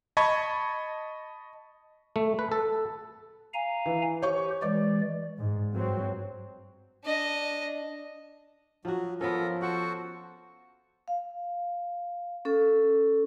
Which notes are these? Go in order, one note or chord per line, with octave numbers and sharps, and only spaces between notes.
D#5 A5 B5 C#6 G#6
A3
B4
A4
F5 G#5 A#5
E3
G4 C5 C#5 C#6
E3 G#3 D5 D6
G#2
G2 F#3 C4
D4 D#5
F3 F#3 F#4
F3 B3 C#4 A4 A#4
F#4 A4 C5 F#5 C#6
F5
C#4 A4